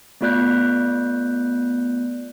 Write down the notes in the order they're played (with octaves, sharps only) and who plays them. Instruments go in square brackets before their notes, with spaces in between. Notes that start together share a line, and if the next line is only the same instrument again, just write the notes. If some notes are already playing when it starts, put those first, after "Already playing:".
[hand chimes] A3 B3 F4 D5 F#6 G6